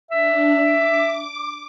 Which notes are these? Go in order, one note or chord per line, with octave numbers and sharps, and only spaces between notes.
D4 E5
D6